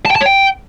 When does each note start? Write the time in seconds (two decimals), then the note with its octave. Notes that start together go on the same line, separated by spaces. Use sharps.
0.06 A5
0.11 G5
0.16 A5
0.21 C#5
0.26 G5